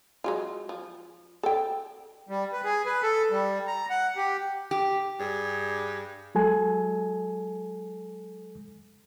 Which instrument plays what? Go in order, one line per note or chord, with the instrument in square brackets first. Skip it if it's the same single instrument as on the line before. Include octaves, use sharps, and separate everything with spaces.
[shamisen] F#3 G#3 F4
F3
A4 G5
[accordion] G3
B4
G#4
B4
A4
G3
A#5
F#5
G4
[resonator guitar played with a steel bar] G4
[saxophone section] G2 D4 G#4
[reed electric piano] F#3 G#3 A4 G#5